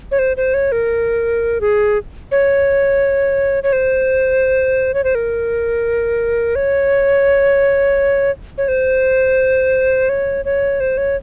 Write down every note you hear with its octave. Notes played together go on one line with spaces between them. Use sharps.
C#5
C5
C5
C#5
A#4
G#4
C#5
C#5
C5
C#5
C5
A#4
C#5
C#5
C5
C#5
C#5
C5
C#5